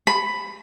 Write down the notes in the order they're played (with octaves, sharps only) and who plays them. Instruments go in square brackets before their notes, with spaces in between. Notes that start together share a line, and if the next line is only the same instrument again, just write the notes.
[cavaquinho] B5